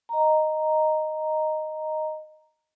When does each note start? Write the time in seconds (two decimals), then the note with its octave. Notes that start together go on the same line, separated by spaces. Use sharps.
0.09 D#5 A#5